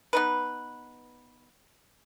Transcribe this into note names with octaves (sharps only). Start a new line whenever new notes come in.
B3 D#4 B4